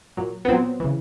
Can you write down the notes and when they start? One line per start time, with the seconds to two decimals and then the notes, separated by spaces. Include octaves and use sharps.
0.17 A#2 F#3
0.45 B3
0.48 A#2 F#3 C4
0.80 C#3 E3